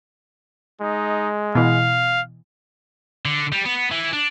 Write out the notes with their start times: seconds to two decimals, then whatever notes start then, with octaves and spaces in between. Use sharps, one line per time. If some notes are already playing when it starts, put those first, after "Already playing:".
0.81 G#3 D#4
1.55 B2 E3 F5
3.25 D3
3.52 G3
3.65 B3
3.91 E3
4.13 D4